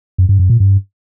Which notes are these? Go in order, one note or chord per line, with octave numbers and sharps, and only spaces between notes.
F#2
G2
F#2
A#2
G2